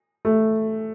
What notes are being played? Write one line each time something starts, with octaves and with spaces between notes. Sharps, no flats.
A3